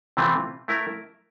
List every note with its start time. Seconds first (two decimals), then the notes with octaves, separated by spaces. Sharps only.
0.17 C3 E3 A3 C4 F4
0.68 A3 E4 A#4